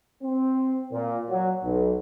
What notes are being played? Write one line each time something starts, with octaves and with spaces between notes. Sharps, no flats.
C4
A#2
F#3
B1